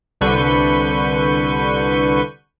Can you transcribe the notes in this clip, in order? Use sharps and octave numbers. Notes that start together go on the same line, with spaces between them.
C2 D3 B4 C#6 G6 D#7